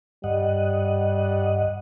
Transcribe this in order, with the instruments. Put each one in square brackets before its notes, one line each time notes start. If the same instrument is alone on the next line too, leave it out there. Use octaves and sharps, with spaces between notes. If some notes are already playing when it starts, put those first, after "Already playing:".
[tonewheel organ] G2 D#5 F#5 [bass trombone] G3